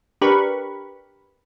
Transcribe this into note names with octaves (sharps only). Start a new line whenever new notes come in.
D4 G4 A#4 B4 B5 C#6